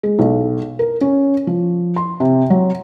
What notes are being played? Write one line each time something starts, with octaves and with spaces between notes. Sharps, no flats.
G#3
B1
A#4
C#4
F3
C6
C3
F#3